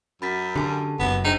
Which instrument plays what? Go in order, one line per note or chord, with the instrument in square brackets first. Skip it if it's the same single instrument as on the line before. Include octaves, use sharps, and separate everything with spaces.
[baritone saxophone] F#2 [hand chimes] B5 A6 B6
[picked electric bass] D3 [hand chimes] G4 G#5 A5
[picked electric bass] F#1 F#2 [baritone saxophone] B3
[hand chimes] D4 G#4 C5 [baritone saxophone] D#4